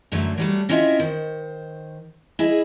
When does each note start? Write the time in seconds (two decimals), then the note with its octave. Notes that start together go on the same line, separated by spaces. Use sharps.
0.12 F#2 D3 F#3 A3
0.38 F#3 G3 A3
0.69 C4 C#4 E4 F4 D#5 E5
0.99 D#3 C5
2.39 E4 G#4 D#5